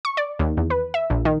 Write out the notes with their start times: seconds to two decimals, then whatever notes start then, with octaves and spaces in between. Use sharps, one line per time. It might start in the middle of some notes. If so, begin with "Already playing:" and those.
0.05 C#6
0.17 D5
0.39 D#2
0.57 E2
0.70 B4
0.94 E5
1.10 A#1
1.25 D#3